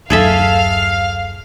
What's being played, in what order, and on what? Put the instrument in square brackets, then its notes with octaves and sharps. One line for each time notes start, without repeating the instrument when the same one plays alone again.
[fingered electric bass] D1 F#2 [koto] G#4 A4 E5 [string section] F5